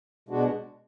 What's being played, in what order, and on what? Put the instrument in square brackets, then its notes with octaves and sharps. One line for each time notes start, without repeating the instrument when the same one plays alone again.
[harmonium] B2 G#3 D4 F#4